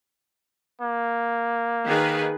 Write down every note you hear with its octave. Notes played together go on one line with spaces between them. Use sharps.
A#3
D#3 G#4 B4